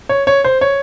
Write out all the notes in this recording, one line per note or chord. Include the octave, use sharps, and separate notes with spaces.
C#5
C#5
C5
C#5